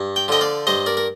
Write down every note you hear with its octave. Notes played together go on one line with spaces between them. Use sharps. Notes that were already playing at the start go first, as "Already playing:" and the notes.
Already playing: G2
G5
D3 F3 D#5 G5
D5 F5
G2 C5 D#5
A#4 D5
A#4